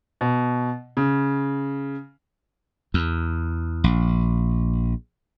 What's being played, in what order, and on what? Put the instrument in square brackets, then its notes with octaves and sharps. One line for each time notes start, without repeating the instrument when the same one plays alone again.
[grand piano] B2
C#3
[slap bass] E2
A#1